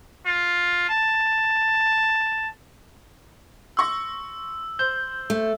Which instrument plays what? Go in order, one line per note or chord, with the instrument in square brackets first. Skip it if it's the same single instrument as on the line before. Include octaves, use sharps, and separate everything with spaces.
[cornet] F4
A5
[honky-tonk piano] C6 C#6 A#6 [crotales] E6
[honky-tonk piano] C5 [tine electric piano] G6
[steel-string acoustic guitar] A3